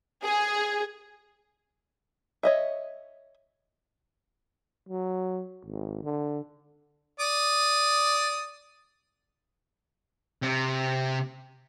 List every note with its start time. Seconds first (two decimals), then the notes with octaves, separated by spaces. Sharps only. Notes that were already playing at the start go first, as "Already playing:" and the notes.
0.24 G#4
2.43 C#5 D#5 E5
4.89 F#3
5.65 G#1
6.03 D3
7.20 D5 D#6
10.42 C3